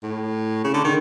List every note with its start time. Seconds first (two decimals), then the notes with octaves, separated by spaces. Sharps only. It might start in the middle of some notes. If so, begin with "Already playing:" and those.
0.03 A2
0.64 C#3
0.74 D3
0.84 D#3